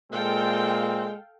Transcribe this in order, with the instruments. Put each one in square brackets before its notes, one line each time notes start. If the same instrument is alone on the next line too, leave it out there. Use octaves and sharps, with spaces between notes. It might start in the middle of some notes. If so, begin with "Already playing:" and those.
[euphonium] A#2 [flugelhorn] G#3 [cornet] C4 [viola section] A4 F5 G5